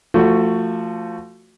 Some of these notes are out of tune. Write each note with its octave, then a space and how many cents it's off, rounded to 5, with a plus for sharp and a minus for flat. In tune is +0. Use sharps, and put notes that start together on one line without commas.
F3 -10 A3 +25 F#4 +0